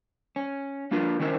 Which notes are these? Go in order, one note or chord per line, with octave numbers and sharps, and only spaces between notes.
C#4
A#3 D4 F4 A#4 B4
D#3 C#4 E4 A#4 C5